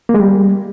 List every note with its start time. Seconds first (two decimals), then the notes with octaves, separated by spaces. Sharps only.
0.09 A#3
0.14 G#3
0.20 G3